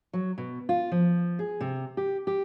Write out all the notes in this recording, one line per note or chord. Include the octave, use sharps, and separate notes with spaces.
F#3
B2
F4
F3
G#4
C3
G4
G4